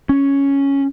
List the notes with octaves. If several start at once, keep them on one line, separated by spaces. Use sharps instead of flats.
C#4